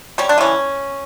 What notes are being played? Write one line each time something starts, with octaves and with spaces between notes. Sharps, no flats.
G3 C#4
D4
E3 C#4